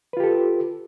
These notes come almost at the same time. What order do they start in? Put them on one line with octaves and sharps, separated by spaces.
B4 F4 G4 A4